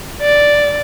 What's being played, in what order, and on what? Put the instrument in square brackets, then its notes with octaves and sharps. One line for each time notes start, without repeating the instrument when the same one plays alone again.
[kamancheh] D5